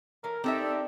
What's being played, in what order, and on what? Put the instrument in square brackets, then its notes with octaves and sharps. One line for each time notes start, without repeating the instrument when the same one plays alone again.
[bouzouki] E3 C#4 A4 [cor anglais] A#4
[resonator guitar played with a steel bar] C4 D#4 E5 [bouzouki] D4 [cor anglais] G4 [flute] A4